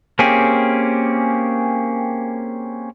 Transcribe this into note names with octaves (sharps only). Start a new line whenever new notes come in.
A#3 C4 C#4 G4 G#4